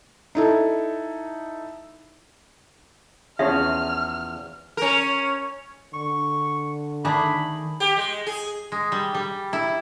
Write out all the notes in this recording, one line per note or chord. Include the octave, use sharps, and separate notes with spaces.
D#4 E4 A4
E2 F3 C#4 G#4 E5 F6
C#4 A#4
D3 C#6
D#3 A3 D4 G#4 B5
G4
G#3
G#4
G#3
G3
G3
E4